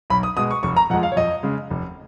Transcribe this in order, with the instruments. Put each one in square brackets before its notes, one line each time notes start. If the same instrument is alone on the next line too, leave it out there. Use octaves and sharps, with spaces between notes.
[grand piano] B1 B5
D#6
B2 G#3 D#6
C#6
F1 C#6
A#5
F2 F3 G#3 F#5
F5
C#5
F2 D#5
C#3 G#3
F1